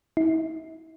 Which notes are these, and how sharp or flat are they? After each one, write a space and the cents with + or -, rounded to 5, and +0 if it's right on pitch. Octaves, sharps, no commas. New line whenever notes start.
E4 -45